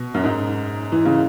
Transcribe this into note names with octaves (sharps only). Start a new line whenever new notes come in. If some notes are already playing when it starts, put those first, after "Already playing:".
Already playing: B2
F#2
G#2
E3
C#3